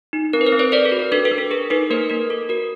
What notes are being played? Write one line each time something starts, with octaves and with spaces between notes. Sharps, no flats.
D#4
C4 A#4
B4
A#4 C5
C4
B4 C#5
A4 C5 D5
A4
F#4
A#4
D4 A4 B4
A4 B4
D4
A4
G#4 A#4
D#4 A4 B4
A#3 A#4 C5
A#3 A#4
A4
F#4 A#4